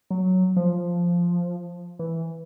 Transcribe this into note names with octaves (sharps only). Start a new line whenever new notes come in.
F#3
F3
E3